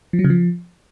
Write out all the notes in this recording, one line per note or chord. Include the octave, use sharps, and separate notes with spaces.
F3
F#3
C#3
F3